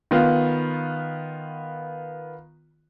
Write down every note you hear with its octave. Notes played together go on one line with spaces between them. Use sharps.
D#3 B3 F4